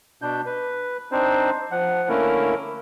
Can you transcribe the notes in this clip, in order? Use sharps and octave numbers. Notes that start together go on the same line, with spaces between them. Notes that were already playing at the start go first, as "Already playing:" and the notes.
B2 D4 G6
B4
C4 D4 D#4 C5
F3 F#5
D3 A3 A#3 C#4 E4 A#4